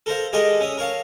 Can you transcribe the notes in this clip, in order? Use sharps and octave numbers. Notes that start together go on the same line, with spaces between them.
A4 A#4 C5 F5
G#3 G4 A4 A#4 D5 D#5
C#4 E5 D#6
A#4 C#5 F5 A5